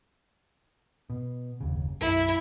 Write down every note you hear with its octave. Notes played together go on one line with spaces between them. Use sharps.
B2
F#1 D#2 C#3
B1 F#2 E4